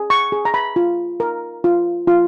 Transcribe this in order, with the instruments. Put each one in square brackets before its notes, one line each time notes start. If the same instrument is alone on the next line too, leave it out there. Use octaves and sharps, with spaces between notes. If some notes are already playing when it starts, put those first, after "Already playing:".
Already playing: [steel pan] G#4
C#6
G#4
A#5
B5
F4
A#4
F4
F4